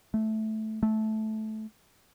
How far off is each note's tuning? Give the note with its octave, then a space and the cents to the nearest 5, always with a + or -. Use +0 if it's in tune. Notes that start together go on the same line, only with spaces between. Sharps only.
A3 -10
A3 -15